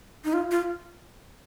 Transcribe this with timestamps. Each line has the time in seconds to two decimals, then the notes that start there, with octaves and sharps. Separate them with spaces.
0.25 D#4
0.33 F4
0.51 F4